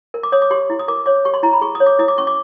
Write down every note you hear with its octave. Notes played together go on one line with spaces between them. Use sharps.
A#4
D6
C#5 D#6
D6
G4 C6
E4
D#6
A#4 D6
C#5 D6
G4 C#6
C6
E4 A#5
B5
G#4 C#6
D#6
C#5
D6
E4 D#6
D6
C#4 C#6
D6